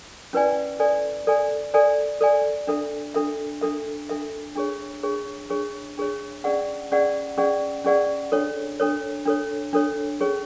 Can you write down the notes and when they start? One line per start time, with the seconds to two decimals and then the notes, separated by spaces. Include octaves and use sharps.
0.33 C#4 E4 B4 D5 G#5
0.80 A4 D5 G#5
1.27 A4 D5 G#5
1.74 A4 D5 G#5
2.21 A4 D5 G#5
2.67 D4 A4 E5
3.14 D4 A4 E5
3.61 D4 A4 E5
4.10 D4 A4 E5
4.56 D4 G#4 C#5
5.03 D4 G#4 C#5
5.50 D4 G#4 C#5
5.98 D4 G#4 C#5
6.44 C#4 G#4 D5 F#5
6.92 C#4 G#4 D5 F#5
7.38 C#4 G#4 D5 F#5
7.84 C#4 G#4 D5 F#5
8.32 D4 A4 C#5
8.80 D4 A4 C#5
9.26 D4 A4 C#5
9.73 D4 A4 C#5
10.21 C#4 G#4 C#5